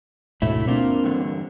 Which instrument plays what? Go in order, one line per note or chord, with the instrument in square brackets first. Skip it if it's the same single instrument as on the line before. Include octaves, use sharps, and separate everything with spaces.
[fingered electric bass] D2 G#2 B2 [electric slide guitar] A3 E4
[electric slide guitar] A#3 F4 [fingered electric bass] C4 D4
[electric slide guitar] E2 G2 D3